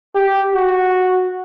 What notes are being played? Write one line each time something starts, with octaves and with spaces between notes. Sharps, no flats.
G4
F#4